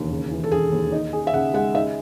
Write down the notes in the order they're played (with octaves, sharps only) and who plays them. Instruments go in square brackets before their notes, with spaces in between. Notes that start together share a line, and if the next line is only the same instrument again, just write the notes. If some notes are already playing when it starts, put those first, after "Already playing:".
Already playing: [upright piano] E1 D#2 E3
C#3
E3
[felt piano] A4
[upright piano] E1 [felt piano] G#4
[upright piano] D#2
D#4
G#4
[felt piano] E5
[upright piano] C#3 [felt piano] F#5
[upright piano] G#3 [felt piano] F#5
[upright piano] D#4 [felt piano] E5